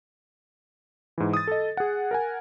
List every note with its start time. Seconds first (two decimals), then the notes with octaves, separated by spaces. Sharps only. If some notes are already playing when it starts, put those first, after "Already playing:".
1.18 G#2 E3
1.33 D#6 A6
1.47 A4 D#5
1.77 G#4 F#5
2.11 A#4 F#5 G#5